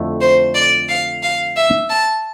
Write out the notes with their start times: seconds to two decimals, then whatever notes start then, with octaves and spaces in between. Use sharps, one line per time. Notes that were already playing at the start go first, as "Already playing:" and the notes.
Already playing: F2 D3 A3 E4
0.21 C5
0.55 D5
0.89 F5
1.23 F5
1.56 E5
1.90 A5